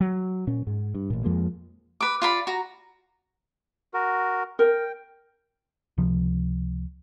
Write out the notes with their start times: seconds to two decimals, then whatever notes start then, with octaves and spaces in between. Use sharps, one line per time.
0.01 F#3
0.47 A#2 C#4
0.67 G#2
0.94 G2
1.10 A1 A#2
1.24 F2 F3 G#3 A#3
2.01 B4 D6
2.22 F4 D5 B5
2.47 F#4 A#5
3.94 F#4 A#4
4.59 A#4 G5
5.98 C#2 C3 F3